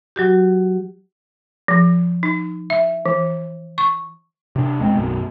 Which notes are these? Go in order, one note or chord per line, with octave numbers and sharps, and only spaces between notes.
F#3 F#4 G4
F3
D#4
E5
E3
C#6
C3 D4
D#1 G#3 C4
B1 F#2